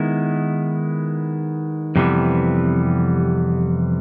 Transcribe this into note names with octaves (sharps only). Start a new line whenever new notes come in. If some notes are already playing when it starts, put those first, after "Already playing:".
Already playing: D#3 G#3 B3 E4
F2 C3 E3 G3 B3